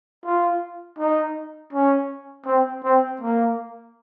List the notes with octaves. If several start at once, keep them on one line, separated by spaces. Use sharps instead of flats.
F4
D#4
C#4
C4
C4
A#3